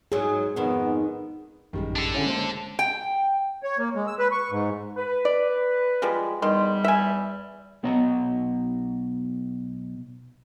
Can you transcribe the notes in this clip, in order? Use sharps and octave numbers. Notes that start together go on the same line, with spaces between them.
G#2 F#3 G#4
F2 G#2 D#3 B3
A1 F#2 D#3 G3 G#3
D4 A4
D3 C#4 E4 F#5
G#3 A#3 C5
G5
C#5
A#3
G#3
E6
B4
C#6
G#2
B4
D5
F3 G3 G#3
E2 D#3 G3 C6
E5 G#5
B1 B3 C#5 D#5 A#5